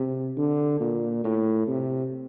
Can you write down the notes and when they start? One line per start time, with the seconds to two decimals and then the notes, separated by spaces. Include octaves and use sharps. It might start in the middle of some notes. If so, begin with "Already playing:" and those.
Already playing: C3
0.37 D3
0.80 A#2
1.24 A2
1.68 C3